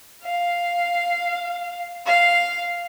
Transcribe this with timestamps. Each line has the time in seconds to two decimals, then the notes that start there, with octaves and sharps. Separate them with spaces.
0.22 F5
2.05 F5